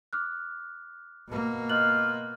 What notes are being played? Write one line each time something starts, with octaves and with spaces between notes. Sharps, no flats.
D6 F6 F#6
B2 A#3
F4 D#5 F#6 F#7